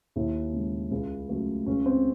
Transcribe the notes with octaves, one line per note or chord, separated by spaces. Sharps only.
D#2 E4
C#3 G#3
C#2
C#3 F#3 A3
C#2 C#4
C4